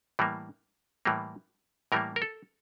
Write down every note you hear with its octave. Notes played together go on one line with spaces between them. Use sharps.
A2 E3 G3 A#3
A2 E3 G3 A#3
A2 E3 G3 A#3 A#4
A#4
A4